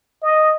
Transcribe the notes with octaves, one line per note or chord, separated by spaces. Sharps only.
D#5